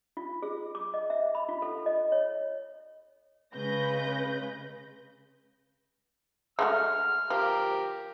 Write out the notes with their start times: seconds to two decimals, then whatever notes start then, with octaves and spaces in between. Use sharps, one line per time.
0.17 F4
0.43 G#4
0.75 D6
0.94 D#5
1.10 E5
1.35 B5
1.49 F4
1.62 A4
1.86 D#5
2.12 C#5
3.54 C#3 G#3 B4 G6 A#6
6.59 G#3 A3 F#4 F6
7.30 F3 G4 A#4